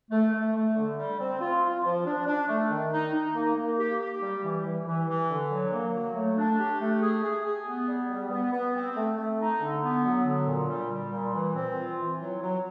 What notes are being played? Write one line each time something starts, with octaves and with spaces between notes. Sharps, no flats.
A3
A3
A3
D3
G3
C4
F4
F4
F3
D4
D4
A3
D#3
D#4
D#4
A#3
A#3
G4
G4
G3
E3
E3
E3
E3
D3
F#3
A#3
F#3
A3
D4
G4
A3
G#4
G#4
G#4
B3
G3
G3
B3
B3
C4
A3
A3
D#4
D3
B3
F#3
D3
A#2
G3
G3
A#2
E3
C4
F4
E3
F#3
F#3